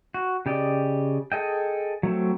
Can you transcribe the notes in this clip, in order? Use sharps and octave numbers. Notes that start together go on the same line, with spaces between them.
F#4
C#3 G4 D5 D#5
G#4 A4 D#5 G5
F#3 A3 C4